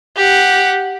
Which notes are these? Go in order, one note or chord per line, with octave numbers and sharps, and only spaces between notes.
G4 F#5